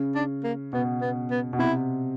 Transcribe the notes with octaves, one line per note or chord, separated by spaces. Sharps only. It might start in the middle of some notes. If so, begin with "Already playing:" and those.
Already playing: C#3
D4
A#3
B2 B3
B3
B3
B2
C3 E4